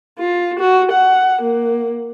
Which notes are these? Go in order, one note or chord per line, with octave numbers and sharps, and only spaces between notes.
F4
F#4
F#5
A#3